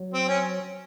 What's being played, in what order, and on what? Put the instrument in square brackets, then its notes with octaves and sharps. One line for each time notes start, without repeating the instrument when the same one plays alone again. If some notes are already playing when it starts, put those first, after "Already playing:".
Already playing: [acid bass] F#3
[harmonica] C4
C#4